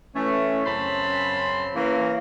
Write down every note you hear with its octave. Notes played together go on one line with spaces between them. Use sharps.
E3 A3 C#4
F#2 C#3 C4 A5 B5 C6
E3 A#3 C#4